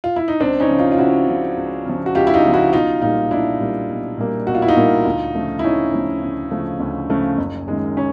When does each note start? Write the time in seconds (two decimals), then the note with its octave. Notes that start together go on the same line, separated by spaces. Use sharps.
0.04 F4
0.16 E4
0.28 D#4
0.40 C#2 C4 D4
0.60 C#4 D#4
0.69 C#3 F3
0.79 D#4 F4
0.92 F4
0.98 C#2 E4 F#4
1.28 C#3 F3
1.57 C#2
1.85 C#3 F3
2.06 F#4
2.15 C#2 F4 G4
2.27 E4
2.34 D#4 F4
2.44 C#3 F3
2.53 E4 F#4
2.73 B1 D#4 F4
3.02 A#2 G3 A#3 D#4 F4
3.31 B1 D4 E4
3.60 A#2 G3 A#3
3.89 B1
4.18 A#2 G3 A#3
4.47 B1 F#4
4.55 F4
4.62 E4
4.68 D#4 F4
4.77 A#2 G3 A#3
5.05 D2
5.35 C#3 F3 A3
5.59 E4
5.63 D2 C#4 D#4
5.93 C#3 F3 A3
6.22 D2
6.51 C#3 F3 A3
6.80 D2
7.10 C#3 F3 A3
7.38 F#1
7.68 F#2 D#3 G#3
7.97 C#4